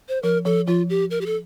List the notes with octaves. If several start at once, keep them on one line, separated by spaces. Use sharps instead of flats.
C5
F3 A#4
F3 A4
F3 F4
G4
A#4
G4
A4